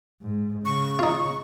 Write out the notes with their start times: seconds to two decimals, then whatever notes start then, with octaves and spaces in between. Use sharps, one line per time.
0.22 G#2
0.65 C#3 C#6
0.99 D#4 F4